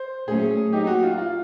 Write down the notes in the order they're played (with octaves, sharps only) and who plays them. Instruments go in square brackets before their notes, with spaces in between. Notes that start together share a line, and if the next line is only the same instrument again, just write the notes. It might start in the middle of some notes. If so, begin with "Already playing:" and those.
Already playing: [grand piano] C5
[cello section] A#2 F#3 A3 C#4 [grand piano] G#4
[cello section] F#3 A#3 D#4 [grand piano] G4
[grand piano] F#4
F4
F4